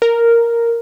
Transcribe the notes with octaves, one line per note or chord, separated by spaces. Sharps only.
A#4